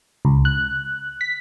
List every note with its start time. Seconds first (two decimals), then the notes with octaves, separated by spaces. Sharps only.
0.25 C#2
0.45 F#6
1.21 B6